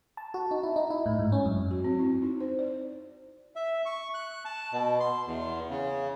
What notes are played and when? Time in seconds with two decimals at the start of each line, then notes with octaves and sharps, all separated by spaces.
0.17 A5
0.34 F#4
0.51 D#4
0.63 E4
0.76 D#4
0.90 E4
1.06 A2
1.19 G#2
1.32 C#4
1.45 F#2
1.71 F#4
1.84 C4
1.99 E4
2.22 D#4
2.40 C5
2.59 D5
3.56 E5
3.86 C#6
4.14 F#6
4.45 A5
4.73 B2
5.00 C6
5.27 E2
5.70 C#3